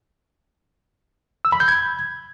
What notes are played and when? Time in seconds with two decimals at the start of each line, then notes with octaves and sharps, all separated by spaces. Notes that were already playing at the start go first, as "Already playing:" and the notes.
1.45 E6
1.52 B5
1.60 G6
1.68 G#6